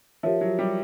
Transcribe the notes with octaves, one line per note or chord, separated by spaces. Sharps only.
F3 G4 A#4 C#5 E5
F#3
G3